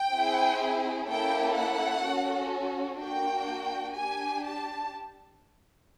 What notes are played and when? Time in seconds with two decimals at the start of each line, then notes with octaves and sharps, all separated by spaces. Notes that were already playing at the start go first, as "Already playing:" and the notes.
Already playing: G5
0.13 C4 E4 G#4
1.08 A#3 C#4 E4 A4 G5
1.57 F#5
2.04 C#4 F#4 A4
3.00 A#3 D4 F#4 G5
3.96 D4 G4 G#5
4.45 A5